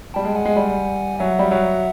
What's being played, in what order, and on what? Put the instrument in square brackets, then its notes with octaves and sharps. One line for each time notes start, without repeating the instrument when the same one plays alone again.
[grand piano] G3 [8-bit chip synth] G5 A5
[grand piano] G#3 [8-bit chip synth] G5
[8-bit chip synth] F#5 G#5
[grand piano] G#3
G3
[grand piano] F#3 [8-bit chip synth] E5 F#5
[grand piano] G3
F#3